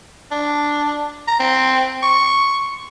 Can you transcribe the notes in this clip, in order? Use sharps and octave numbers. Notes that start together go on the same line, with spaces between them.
D4
A#5
C4
C#6